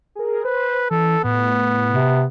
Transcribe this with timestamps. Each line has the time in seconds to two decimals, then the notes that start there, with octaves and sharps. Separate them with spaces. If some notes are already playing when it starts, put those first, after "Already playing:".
0.15 G#4 A#4
0.45 B4 C5
0.91 E3 A4
1.24 A2 B3
1.90 C3